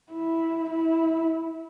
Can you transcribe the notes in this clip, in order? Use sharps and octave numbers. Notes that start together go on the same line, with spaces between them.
E4
E4